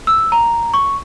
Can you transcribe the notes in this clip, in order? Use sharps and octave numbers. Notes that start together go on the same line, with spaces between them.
E6
A#5
C#6